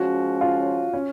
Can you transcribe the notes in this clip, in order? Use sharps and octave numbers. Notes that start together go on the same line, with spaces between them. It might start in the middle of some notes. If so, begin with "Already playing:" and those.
Already playing: F3 G#3 C#4 F#4
F4
C#4